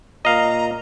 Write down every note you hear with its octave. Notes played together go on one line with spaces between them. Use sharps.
A#2 D#5 F5 A#5